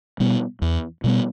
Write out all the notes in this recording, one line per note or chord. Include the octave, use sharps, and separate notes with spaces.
B2 G3 B3
E2
B2 G3 B3